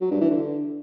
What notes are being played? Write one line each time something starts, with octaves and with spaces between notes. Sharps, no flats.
F#3
G2
E3
D3